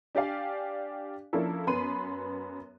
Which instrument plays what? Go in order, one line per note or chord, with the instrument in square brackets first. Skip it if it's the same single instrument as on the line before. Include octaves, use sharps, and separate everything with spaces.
[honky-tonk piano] D4 G4 D5 F5 G#5
F3 A#3 C#4 D4 E4 A4
F#2 B3 B5 C6 D#7